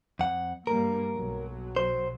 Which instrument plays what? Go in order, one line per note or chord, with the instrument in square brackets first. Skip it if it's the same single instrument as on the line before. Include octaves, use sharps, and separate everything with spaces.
[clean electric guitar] F2 F#5
[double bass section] G2 G3 A#3 [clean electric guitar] A#4
[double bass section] B1 F#3
[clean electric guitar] C5